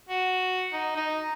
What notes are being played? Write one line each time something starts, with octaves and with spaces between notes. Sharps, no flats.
F#4
D#4
D#4